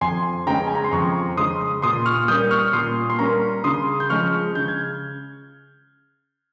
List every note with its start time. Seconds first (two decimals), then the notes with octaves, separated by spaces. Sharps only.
0.01 F2 G#5 C6
0.46 C#3 G#3 C#4 G5 A#5
0.67 G#5
0.75 A#5
0.84 C6
0.92 F2 A#5 C#6
1.37 C#3 G#3 C#4 C6 D#6
1.82 A#2 C6 D#6
2.06 C#6 F6
2.28 G3 A#3 C#4 D#6 G6
2.51 C#6 F6
2.73 A#2 C6 D#6
3.10 C6
3.19 G3 A#3 C#4 A#5 C#6
3.64 C#3 C6 D#6
4.00 G6
4.09 F3 G#3 C#4 C#6 F6
4.55 C#3 G6
4.68 G#6